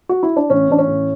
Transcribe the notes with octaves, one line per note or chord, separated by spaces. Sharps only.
F#4
E4
D4
A1 C#4
A1 D4
C#4
A2